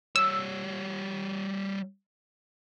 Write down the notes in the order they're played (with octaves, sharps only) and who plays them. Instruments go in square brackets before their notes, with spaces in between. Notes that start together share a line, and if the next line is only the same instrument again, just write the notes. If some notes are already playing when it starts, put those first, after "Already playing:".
[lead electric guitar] G3 C#5 [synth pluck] E6